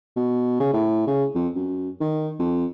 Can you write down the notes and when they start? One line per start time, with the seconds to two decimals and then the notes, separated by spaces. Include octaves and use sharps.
0.16 B2
0.60 C#3
0.73 A2
1.07 C#3
1.35 F2
1.55 F#2
2.00 D#3
2.39 F2